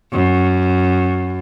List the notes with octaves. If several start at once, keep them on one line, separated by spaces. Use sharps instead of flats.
F#2